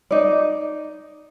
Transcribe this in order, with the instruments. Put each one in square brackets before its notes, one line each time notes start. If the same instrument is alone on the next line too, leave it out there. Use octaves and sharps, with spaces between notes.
[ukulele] D#4 D5